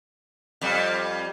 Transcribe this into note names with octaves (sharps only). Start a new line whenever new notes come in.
F2 G3